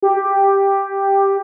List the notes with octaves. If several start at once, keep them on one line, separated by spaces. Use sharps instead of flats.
G4